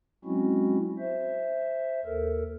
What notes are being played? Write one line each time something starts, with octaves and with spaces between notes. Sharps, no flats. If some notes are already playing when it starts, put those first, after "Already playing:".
F#3 G#3 C4 C#4 E4 F#4
C5 E5
D#2 A4 A#4